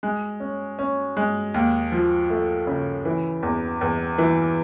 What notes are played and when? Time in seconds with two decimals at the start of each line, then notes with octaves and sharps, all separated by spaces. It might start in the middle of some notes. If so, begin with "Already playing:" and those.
0.03 G#3
0.40 C#4
0.79 C#4
1.17 G#3
1.54 D#2
1.92 F3
2.30 A3
2.67 C#3
3.05 E3
3.43 E2
3.81 E2
4.18 E3